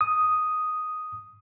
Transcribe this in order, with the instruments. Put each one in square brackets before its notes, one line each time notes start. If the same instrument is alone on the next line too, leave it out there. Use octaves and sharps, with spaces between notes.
[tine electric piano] D#6